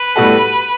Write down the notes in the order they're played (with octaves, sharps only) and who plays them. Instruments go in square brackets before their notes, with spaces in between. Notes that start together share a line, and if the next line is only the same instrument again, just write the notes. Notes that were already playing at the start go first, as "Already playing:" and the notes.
Already playing: [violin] B4
[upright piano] A2 G3 B3 F#4 A4